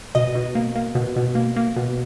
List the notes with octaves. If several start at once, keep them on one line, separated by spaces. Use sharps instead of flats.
B2 D#5
B2
A#3
A#3
B2
B2
A#3
A#3
B2